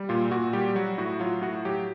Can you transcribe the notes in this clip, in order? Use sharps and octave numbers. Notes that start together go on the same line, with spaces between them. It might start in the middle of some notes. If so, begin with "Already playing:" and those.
Already playing: G3
A#2 F4
A#2 F#4
G3 G4
F#3 F#4
A2 F#4
F#3 F4
A2 F#4
F#3 G4